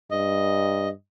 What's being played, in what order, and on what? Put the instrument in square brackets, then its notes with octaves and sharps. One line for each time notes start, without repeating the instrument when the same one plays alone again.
[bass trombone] G2 [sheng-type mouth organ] D#5